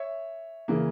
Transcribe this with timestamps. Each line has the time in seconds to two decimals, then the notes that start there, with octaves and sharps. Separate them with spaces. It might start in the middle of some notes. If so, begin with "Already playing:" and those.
Already playing: C#5 E5
0.68 C#3 E3 A#3